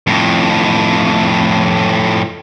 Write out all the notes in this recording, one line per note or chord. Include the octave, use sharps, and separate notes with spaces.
F2 A2